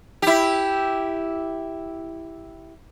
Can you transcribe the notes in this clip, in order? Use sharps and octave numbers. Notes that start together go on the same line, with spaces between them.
E4 G4